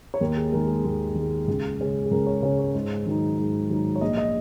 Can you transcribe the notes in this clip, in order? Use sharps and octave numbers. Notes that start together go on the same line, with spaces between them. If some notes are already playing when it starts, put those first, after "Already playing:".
C#5
D#2 A#4
G#4
D#3 G#3 A#4
G#4
D#2
D#3 G#3
C#2
C#3 G#3 C#4
G#4
C#2 A#4
C#5
C#3 G#3 C#4 C#5
C#5
G#2
D#3 F#3 D#4
G#2
D#3 F#3 D#4
C#5
A#1 D#5
D#5